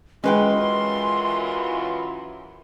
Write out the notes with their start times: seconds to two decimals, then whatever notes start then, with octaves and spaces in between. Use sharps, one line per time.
0.24 F#2 E3 G#3 C#4 F4 B4 G5 C6